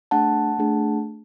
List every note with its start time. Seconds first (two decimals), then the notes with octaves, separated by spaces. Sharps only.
0.11 A3 D4 G#4 F#5 A5
0.59 A3 D4 G#4